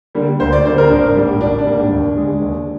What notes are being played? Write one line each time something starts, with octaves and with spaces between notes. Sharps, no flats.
D3 G3 A#3
D2 C5
D5
D3 G3 A#3 C5
A#4
G#1 D4
G#2 G3 A#3
G#1 D4
D4
G#2 G3 A#3
D#2
D3 G#3
D#2